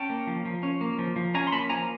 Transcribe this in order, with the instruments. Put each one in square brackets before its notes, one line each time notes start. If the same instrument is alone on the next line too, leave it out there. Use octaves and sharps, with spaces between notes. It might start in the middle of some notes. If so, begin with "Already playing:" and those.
Already playing: [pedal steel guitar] C#4 G5 A5
A#3
F3
F3
C#4
A#3
F3
F3
C#4 G#5 A#5
C6
A#3 A5 B5
F3 G#5 A#5